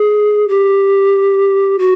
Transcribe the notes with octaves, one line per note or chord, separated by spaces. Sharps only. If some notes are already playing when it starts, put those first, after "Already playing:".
Already playing: G#4
G4
F#4